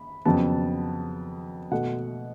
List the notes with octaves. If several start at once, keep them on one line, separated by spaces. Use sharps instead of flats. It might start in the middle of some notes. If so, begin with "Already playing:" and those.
Already playing: B5
F2 C#3 F#3 B3 A5
B2 A3 F#5